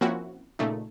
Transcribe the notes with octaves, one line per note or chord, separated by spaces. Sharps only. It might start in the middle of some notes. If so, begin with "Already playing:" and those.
F3 A#3 C4 C#4 E4 F#4
A#2 C#3 A3 A#3 D#4